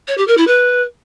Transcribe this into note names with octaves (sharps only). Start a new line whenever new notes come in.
C#5
G4
A#4
E4
B4